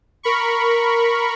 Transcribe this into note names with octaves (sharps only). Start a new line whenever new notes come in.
A#4 B5 C#6